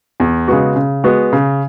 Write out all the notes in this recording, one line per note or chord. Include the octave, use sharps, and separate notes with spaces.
E2
C#3 G#3 B3 F#4
C#3
G#3 B3 F#4
C#3